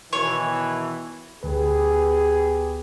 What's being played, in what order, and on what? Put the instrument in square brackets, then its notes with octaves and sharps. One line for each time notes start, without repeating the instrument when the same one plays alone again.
[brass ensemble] B2 D#3 E3 [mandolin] C#5
[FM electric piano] D2 B4 [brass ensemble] B3 G4 G#4